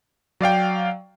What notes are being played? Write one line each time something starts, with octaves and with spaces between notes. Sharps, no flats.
F#3 D5 F5 G5